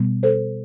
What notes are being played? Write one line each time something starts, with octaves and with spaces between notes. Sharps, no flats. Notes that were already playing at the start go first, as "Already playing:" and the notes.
Already playing: B2 G3 B3
A4 C5